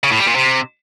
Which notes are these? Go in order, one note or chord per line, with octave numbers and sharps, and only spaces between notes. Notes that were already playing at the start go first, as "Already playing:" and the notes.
C#3
A2
G3
A#2
C3